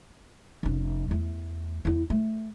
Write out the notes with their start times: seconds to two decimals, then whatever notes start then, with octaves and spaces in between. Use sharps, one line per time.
0.63 F1 C#4
1.08 E2 A3
1.85 E2 E4
2.10 A3